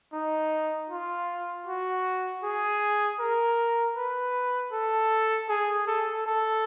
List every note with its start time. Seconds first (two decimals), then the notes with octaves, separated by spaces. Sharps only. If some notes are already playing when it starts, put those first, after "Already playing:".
0.13 D#4
0.90 F4
1.66 F#4
2.43 G#4
3.20 A#4
3.97 B4
4.73 A4
5.49 G#4
5.87 A4
6.26 A4